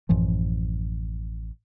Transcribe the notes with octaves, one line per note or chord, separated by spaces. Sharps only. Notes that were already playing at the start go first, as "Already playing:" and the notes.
A1 F#2 E3 F3